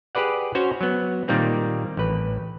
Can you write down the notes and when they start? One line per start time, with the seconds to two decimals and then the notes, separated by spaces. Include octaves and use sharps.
0.15 G4 G#4 B4 D5 F#5
0.55 C#4 F#4 C5 C#5
0.81 F#3 B3
1.28 A#2 D#3 G3 A#3 C4
1.97 A1 B4